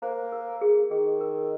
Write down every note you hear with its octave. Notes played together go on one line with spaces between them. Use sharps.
A#3 C5
A#4
G#4
D#3 G#4
A#4